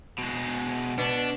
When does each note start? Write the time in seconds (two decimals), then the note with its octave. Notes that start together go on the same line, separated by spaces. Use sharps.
0.18 B2 G#3
0.98 B2 D4